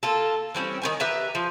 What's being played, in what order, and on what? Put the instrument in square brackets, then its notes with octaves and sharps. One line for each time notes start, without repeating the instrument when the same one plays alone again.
[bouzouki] A#3 F4 A4
E3 G3 C4 C#4
D#3 C4 G#5
G4 B4 E5 A#5
F3